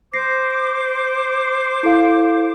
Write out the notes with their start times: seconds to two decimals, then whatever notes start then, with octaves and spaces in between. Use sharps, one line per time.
0.14 C5 D6 A#6 C7
1.83 E4 A4 F5